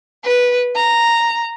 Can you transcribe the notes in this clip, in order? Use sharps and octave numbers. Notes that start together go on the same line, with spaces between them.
B4
A#5